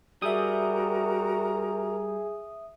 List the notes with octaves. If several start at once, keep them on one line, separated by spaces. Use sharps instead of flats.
G3 F#4 G#4 A#4 E5 A#5 D#6